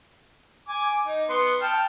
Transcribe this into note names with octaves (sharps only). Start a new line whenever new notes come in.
G#5 D6
D#4
B3 C6
G5 A5 F6